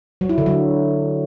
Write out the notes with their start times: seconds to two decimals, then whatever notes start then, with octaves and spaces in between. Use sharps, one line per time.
0.21 F#3
0.29 E4
0.38 D3
0.46 F#3